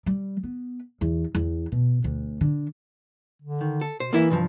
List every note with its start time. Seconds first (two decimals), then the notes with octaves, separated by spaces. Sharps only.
0.06 G3
0.43 B3
1.01 E2
1.35 E2
1.72 B2
2.04 D2
2.41 D3
3.42 D3
3.61 D#3
3.81 A4
4.00 B2 C5
4.13 E3 A#3 E4 E5
4.30 C2 G2 F3